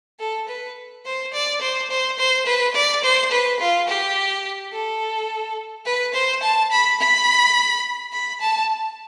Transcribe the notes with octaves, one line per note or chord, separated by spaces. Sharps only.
A4
B4
C5
D5
C5
C5
C5
B4
D5
C5
B4
F4
G4
A4
B4
C5
A5
B5
B5
B5
A5